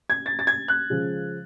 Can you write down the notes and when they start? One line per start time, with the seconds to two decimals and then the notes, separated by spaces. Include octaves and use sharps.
0.10 G#6
0.26 A6
0.39 A6
0.47 G#6
0.68 F#6
0.90 C#3 F3 G#3